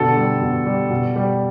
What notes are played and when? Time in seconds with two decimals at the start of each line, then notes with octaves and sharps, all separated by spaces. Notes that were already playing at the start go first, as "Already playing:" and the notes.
Already playing: B2 D3 A4
0.17 G3
0.41 B2
0.66 G3
0.90 B2
1.16 G3